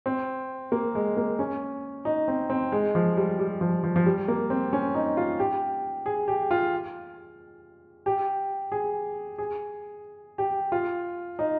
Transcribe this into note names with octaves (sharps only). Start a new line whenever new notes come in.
C4
A#3
G#3
A#3
C#4
D#4
C4
C4
G#3
F3
G3
G3
F3
F3
F3
G3
A#3
C4
C#4
D#4
F4
G4
G#4
G4
F4
G4
G#4
G#4
G4
F4
D#4